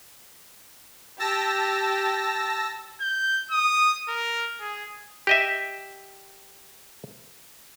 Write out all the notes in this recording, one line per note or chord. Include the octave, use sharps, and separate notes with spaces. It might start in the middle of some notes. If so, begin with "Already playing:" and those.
G4 A5 E6 A#6
G6
D#6
A#4
G#4
G4 D#5 E5